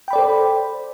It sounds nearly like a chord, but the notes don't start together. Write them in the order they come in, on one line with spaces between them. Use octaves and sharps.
G5 B5 D5 A4 C5